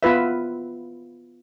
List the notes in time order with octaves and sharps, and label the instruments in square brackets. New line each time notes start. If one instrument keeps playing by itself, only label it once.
[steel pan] B3 F4 B4 E5